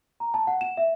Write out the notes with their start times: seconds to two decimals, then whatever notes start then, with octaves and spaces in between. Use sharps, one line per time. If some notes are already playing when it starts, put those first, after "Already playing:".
0.20 A#5
0.34 A5
0.47 F#5
0.61 E7
0.77 E5